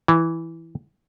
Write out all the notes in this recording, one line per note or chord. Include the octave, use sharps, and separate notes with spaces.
E3